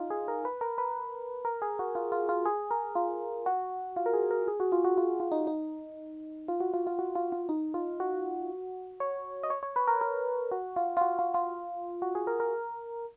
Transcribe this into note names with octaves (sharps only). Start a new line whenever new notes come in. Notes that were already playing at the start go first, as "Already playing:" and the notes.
Already playing: D#4 F4
G#4
A#4
B4
A#4
B4
A#4
G#4
F#4
F4
F4
F4
G#4
A#4
F4
F#4
F4
A#4
G#4
A#4
G#4
F#4
F4
F#4
F4
F4
D#4
D#4
F4
F#4
F4
F4
F#4
F4
F4
D#4
F4
F#4
C#5
D#5
C#5
C#5
B4
A#4
A#4
F#4
F4
F4
F#4
F4
F4
F#4
G#4
A#4
A#4